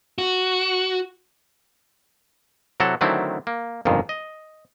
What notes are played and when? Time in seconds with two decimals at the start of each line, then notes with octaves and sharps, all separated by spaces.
0.18 F#4
2.80 C3 F#3 E4 F#4 A4
3.01 D3 D#3 F#3 A3 C4 E4
3.47 A#3
3.85 G1 F2 A#2 D#3
4.09 D#5